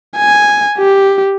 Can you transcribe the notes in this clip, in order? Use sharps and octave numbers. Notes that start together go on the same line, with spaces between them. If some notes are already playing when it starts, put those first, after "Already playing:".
G#5
G4